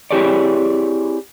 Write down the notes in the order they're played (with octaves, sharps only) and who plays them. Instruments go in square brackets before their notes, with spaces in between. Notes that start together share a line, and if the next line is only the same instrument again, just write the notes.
[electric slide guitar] C4 E4 G4 G#4 C#5 D5